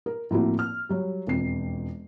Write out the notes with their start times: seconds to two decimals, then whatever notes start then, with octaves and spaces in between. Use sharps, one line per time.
0.06 A#4
0.31 A2 F3 A#3 C4 E4 F#4
0.59 F6
0.89 F#3 G3
1.27 E1 F2 C7